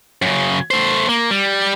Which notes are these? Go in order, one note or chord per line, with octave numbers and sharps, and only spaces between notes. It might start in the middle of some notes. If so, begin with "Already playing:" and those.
F#2 C#3
A3 C5
A#3
G3